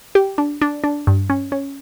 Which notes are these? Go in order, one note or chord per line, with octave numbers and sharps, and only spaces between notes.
G4
D4
D4
D4
G2
C#4
C#4